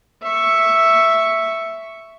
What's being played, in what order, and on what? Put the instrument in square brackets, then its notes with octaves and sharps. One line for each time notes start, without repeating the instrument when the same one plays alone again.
[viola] E5 C#6